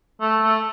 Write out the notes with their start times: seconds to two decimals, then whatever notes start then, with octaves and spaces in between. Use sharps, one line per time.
0.21 A3
0.42 A3